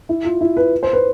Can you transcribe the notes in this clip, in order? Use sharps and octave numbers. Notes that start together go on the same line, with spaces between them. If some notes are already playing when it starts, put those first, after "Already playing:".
E4
F4
E4
B4
C5
B4